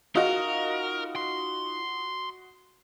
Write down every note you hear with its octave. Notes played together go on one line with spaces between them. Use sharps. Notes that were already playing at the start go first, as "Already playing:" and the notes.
D#4 F4 F#4 A#4 D#5 F5
C6